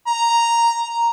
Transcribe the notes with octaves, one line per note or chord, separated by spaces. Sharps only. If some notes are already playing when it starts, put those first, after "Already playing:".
A#5